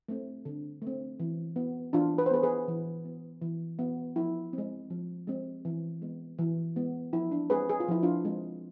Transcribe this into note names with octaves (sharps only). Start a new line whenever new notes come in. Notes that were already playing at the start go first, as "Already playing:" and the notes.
A3 C4
D3
A3 C4
E3
B3
E3 D4 F4
B4
C5
B3 G#4 B4
G#4 B4
E3
B3
E3
B3
F3 E4
C4
G#3
F3
G#3 C4
E3
G#3 B3
E3
G#3 B3
F3 E4
D4
G#3 C4 G#4 B4
G#4
F4
F3 E4
D4 F4
G#3 C4